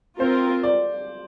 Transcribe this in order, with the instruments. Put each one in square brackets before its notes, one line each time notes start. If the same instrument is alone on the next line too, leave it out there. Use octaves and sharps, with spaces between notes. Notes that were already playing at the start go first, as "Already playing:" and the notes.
[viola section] C4 F4 A#4 [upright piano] C5
[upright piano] D5